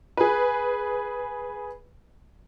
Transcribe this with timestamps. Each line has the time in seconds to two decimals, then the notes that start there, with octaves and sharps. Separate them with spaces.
0.17 G#4 B4